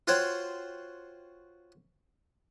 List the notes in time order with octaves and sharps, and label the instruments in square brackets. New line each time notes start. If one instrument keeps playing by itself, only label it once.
[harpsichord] F4 F#4 C5 C#5 F#5 G5